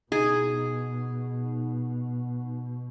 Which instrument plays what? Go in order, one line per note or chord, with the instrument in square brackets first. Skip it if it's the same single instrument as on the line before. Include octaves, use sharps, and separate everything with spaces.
[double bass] B2 [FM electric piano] D#4 [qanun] G#4